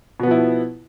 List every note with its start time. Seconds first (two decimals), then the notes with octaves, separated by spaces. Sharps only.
0.20 B2
0.23 B3
0.27 F3
0.31 E4